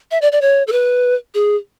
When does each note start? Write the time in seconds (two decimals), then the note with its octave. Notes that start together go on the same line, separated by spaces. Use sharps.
0.11 E5
0.22 D5
0.32 D5
0.42 C#5
0.67 A4
0.72 B4
1.34 G#4